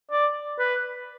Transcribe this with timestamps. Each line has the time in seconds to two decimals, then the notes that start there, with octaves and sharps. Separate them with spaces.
0.12 D5
0.59 B4